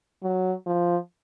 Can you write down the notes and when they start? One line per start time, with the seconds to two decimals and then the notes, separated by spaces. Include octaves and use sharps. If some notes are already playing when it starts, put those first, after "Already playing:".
0.23 F#3
0.67 F3